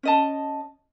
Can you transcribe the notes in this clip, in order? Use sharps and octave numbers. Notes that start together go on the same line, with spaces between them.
C#4 D#5 A5